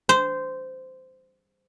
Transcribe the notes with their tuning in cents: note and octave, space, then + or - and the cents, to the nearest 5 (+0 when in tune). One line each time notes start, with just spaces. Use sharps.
C5 -15